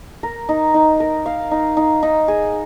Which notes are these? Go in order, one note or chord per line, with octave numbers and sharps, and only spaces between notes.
A#4
D#4
D#4
A#4
F5
D#4
D#4
D#4
G#4